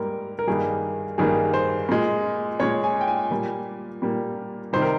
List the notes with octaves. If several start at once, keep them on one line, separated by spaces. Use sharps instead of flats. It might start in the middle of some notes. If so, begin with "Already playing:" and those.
Already playing: G#2 G3 A#3 A#4
A#4
G2 D#3 G3 A#3 G#4
G2 D#3 G3 A#3 G#4
C5
A#2 G#3
A#2 G#3 C#5
G#5
G5
G#5
A#2 G3 A#3
A#2 G3 A#3
C3 D#3 G3 C5
A#4